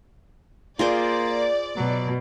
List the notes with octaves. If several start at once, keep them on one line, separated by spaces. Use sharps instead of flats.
A#3 F4 G#4 C5 D5
B2 F#3